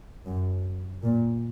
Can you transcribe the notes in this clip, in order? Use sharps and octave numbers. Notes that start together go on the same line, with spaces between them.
F#2
A#2